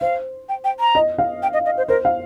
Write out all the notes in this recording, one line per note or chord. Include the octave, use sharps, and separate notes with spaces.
C5 F5
G5
G5
A#5
D#5
F5
G5
D#5
D#5
C5
A#4 C5
F5